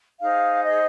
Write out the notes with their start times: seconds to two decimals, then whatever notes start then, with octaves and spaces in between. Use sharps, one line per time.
0.21 D#4 G#4 C5 F5
0.64 D#5